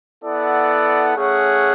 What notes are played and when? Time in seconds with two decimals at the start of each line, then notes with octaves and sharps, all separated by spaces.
0.23 B3 E4 A4 D5 F#5
1.16 A3 C#4 G#4 C#5 F#5